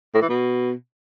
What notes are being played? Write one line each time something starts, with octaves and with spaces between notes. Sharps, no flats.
A2
E3
B2